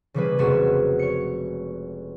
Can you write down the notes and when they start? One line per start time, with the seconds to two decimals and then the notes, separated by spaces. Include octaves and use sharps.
0.14 C#3 E3 G3 A#3 G#4 B4
0.39 F1 G#3 F#4 G#4 E7
0.99 C#5 C#7